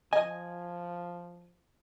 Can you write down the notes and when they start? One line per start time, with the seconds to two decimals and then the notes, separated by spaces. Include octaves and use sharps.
0.13 F3 D#5 G#5